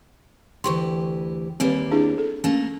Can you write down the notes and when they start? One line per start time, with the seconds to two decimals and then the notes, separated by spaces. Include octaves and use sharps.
0.64 D2 E3 G4 C6 C#6
1.60 D#2 G3 A#3 C4 B4
1.91 D4 E4 G#4
2.18 A4
2.44 A3 A#3 C#4